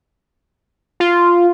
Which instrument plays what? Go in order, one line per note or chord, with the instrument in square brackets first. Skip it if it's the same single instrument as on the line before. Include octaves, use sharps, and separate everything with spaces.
[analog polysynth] F4